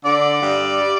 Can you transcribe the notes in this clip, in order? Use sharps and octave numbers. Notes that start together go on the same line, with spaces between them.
D3 D5
G2
G3